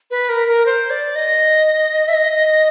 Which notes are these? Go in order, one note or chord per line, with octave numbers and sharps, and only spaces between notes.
B4
A#4
A#4
C5
D5
D#5
E5
D#5